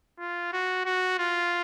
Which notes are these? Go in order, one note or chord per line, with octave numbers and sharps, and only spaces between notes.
F4
F#4
F#4
F4